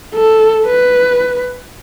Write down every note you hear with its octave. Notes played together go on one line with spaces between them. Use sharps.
A4
B4